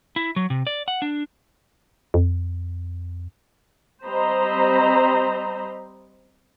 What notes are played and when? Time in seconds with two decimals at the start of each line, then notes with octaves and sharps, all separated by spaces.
0.16 E4
0.36 F#3
0.50 C3
0.67 D5
0.88 F#5
1.02 D4
2.14 F2
4.05 G3 C4 C5 D#5 A#5 B5